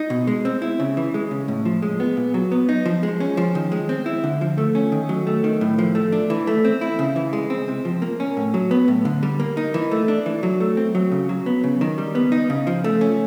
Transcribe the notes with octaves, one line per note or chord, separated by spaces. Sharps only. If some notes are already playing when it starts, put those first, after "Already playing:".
Already playing: D#4
B2
G#3
C4
E4
C#3
E3
G#3
C#3
A2
F3
G#3
B3
A#2
F#3
B3
D#4
F3
G#3
C#4
F3
D#3
G#3
C4
E4
D3
F3
A3
C#4
D#3
F#3
A3
D#3
A2
F3
A3
D4
E3
A3
C4
E4
C#3
E3
G#3
C4
C3
F3
A#3
C#4
A2
F#3
B3
A2
D3
G3
A#3
D#4
E3
A3
D4
E3
F#3
A3
C4
F#3
C#3
F#3
B3
C#3
D#3
G3
B3
D#4
C#3
F3
A3
C#4